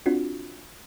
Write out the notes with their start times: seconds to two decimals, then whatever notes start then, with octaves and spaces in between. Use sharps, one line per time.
0.06 C4 D4 F4 F#4